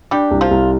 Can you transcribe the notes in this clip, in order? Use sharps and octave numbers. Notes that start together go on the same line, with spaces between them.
G3 D4 G4
C2
F3 F4
C2